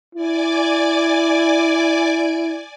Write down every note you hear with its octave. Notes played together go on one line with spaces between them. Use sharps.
E4 D5 G#5 D6